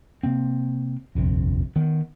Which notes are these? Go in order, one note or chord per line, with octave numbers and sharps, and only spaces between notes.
C3 A#3 C4
D#1 A#1 F2 C3
D#3 B3